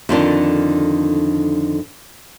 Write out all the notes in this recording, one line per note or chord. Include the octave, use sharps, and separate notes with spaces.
F2 D3 D#3 D4